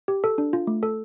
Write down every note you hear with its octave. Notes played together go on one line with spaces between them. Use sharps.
G4
A4
D4
F4
A3
A4